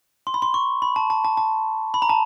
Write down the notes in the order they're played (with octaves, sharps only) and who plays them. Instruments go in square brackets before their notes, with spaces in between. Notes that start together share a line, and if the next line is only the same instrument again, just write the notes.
[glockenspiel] C6
B5
C6
C#6
B5
A5
A5
A5
A5
B5
A#5
A5